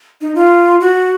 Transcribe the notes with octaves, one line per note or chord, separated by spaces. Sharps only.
D#4
F4
F#4